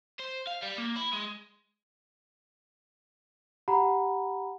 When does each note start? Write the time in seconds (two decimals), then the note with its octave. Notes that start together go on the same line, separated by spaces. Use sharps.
0.20 C5
0.47 F5
0.63 G3
0.78 A#3
0.96 E4
1.13 G#3
3.68 G4 F#5 A#5 B5